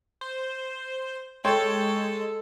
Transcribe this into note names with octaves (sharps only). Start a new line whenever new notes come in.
C5
G#3 A4 C#5 G5 C6